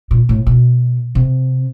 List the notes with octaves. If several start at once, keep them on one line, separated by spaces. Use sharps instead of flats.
A#2
A2
B2
C3